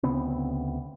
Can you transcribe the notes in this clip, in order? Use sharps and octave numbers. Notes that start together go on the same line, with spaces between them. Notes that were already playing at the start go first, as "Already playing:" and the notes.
D2 C#3 B3 C4